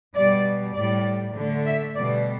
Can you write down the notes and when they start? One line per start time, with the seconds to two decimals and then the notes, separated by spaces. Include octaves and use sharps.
0.16 B2 G3 D5
0.76 A2 G3 D5
1.35 D3 A3
1.66 E5
1.95 B2 G3 D5